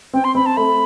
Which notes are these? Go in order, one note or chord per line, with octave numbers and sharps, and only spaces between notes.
C4 G5
C6
C4 B5
A5
A3 B5